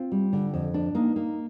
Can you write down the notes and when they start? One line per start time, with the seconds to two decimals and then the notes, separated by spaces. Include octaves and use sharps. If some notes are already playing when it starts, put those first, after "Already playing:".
Already playing: C4 F4
0.12 G3
0.33 D3
0.54 F2
0.74 D4
0.95 A#3 D#4
1.16 A#3